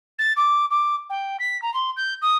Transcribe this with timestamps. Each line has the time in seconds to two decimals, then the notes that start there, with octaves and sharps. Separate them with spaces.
0.19 A6
0.36 D6
0.70 D6
1.10 G5
1.40 B6
1.62 A#5
1.74 C6
1.97 G6
2.22 D#6